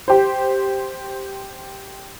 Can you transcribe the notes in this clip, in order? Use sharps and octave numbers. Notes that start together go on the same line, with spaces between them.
G4 C5